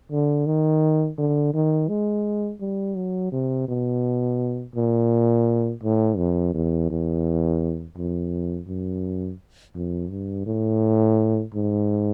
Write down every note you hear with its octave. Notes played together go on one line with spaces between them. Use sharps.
D3
D#3
D3
D#3
G#3
G3
F#3
C3
B2
A#2
A2
F2
E2
E2
F2
F#2
F2
G2
A2
G#2